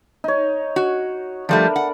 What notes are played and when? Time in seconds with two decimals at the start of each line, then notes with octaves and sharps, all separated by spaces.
0.24 D#4 C#5
0.76 F#4
1.49 F3 G3 A3 D4 A#4 B5
1.76 F#5